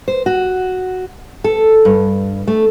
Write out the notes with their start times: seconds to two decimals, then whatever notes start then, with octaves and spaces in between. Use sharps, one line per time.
0.08 C5
0.26 F#4
1.44 A4
1.85 G2
2.47 A3